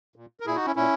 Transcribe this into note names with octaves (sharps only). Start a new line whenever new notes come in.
A#2
A#4
A#2 E4 G#4
D#4 F#4
C#4 E4
A#2 C#4 E4